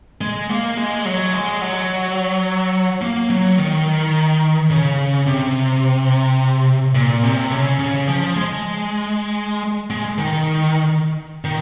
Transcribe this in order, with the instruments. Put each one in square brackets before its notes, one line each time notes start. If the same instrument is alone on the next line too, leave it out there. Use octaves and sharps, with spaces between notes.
[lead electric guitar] G#3
A#3
G#3
F#3
G#3
F#3
A#3
F#3
D#3
C#3
C3
A#2
C3
C#3
C#3
F3
G#3
G#3
D#3
D#3